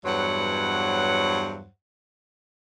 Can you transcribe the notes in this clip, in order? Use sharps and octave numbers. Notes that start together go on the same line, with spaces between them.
E2 G2 F#3 C5 C#5 F#5